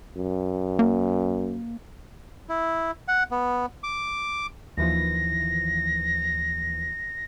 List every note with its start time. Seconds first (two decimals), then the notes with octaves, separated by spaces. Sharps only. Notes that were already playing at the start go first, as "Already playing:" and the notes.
0.17 F#2
0.79 A#3
2.49 E4
3.08 F#5
3.31 B3
3.83 D6
4.77 D#2 E3 F3 A#6